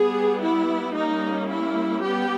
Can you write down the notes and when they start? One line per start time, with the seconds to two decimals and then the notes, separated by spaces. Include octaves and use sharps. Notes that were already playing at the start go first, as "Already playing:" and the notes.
Already playing: G3 B3 G#4
0.43 E4
0.96 G3 A#3 C#4 D#4
1.51 E4
2.04 G3 B3 G4